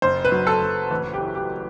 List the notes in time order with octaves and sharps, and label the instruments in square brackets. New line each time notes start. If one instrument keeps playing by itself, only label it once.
[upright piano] F#1 C5
B4
F#3
A4
F#1
A1 B4
G4
E3
G4